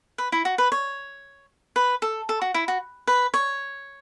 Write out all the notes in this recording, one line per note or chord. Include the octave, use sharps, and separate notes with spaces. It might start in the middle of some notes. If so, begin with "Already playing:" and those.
B4
E4
F#4
B4
C#5
B4
A4
A4
F#4
E4
F#4
B4
C#5